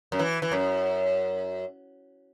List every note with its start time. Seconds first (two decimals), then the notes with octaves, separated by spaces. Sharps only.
0.12 F#2
0.19 E3
0.42 E3
0.52 F#2